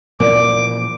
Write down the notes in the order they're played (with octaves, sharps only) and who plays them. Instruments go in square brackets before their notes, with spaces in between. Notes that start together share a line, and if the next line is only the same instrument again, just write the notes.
[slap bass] A#2 E3 F3 [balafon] A#4 D5 [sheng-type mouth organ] D6